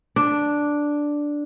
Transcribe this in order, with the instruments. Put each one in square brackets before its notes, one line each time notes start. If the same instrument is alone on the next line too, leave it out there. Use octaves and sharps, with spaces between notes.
[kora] D4